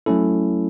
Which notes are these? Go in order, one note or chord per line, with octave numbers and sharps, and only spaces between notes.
F#3 A3 C#4 E4 A4